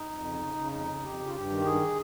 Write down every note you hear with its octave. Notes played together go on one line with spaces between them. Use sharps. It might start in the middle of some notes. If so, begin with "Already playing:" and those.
Already playing: D#4
F2
C#3
C#3
C#3
F2 D#4
C#3
F2 G4
C#3
F4
G2 G4
D#3
G2 G#4